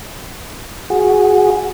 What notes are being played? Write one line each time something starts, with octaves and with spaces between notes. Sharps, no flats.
F#4 G#4